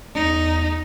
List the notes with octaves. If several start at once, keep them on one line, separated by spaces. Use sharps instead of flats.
E2 D#4